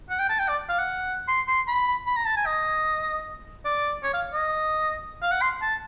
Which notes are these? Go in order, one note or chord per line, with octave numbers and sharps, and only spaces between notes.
F#5
G5
A5
G5
D5
F5
F#5
C6
C6
B5
B5
A#5
A5
G#5
D#5
D5
C#5
F5
D#5
F5
F#5
C6
A5